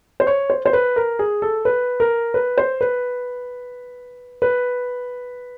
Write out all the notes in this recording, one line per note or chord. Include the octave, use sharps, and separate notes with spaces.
C5
C#5
C5
C5
B4
A#4
G#4
A4
B4
A#4
B4
C5
B4
B4